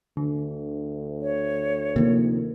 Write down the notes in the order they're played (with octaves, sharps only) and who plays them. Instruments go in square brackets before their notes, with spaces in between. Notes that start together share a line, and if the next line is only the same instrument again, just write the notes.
[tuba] D2 [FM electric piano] D3
[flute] C#5
[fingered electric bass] C3 D#3 F3 [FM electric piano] A#3